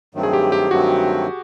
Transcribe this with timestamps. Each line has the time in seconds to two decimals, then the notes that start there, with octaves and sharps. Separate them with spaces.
0.15 G2 D#3 F#3 A3 C4
0.23 G#4
0.33 G4
0.52 G4
0.71 G2 D#3 F#3 A3 C4 F#4